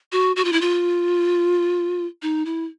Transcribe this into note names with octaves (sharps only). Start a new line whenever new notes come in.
F#4
F#4
F4
E4
F4
D#4
E4